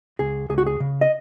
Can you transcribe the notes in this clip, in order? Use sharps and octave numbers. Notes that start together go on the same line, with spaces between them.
C#2 G#4
C#2 G#4
F#4
G#4
C#3
D#5